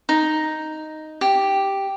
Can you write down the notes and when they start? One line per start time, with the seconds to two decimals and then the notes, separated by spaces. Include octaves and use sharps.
0.09 D#4
1.21 G4